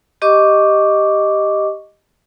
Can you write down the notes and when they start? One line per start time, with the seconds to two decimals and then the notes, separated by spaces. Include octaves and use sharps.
0.22 G4 D#5 C#6 D6